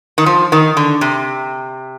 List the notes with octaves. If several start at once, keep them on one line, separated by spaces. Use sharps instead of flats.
D#3
F3
D#3
D3
C3